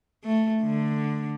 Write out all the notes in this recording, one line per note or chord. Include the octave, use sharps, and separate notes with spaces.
A3
D3